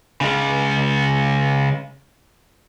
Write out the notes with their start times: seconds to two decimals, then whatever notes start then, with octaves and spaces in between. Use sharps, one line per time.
0.21 C#3 G#3